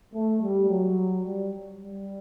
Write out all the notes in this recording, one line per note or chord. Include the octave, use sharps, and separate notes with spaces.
A3
G3
F#3
G3
G3